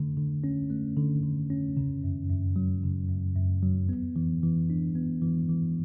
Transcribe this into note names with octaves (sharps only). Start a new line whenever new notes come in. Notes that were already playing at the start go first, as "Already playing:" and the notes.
Already playing: D3 A3
D3
C#4
A3
D3
D3
C#4
C#3
F#2
F#2
F#3
C#3
F#2
F#2
F#3
B3
E3
E3
D4
B3
E3
E3